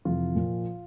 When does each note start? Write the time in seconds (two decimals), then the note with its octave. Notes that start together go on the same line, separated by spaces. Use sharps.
0.05 F2 C3 E3 F4
0.35 A#2 F3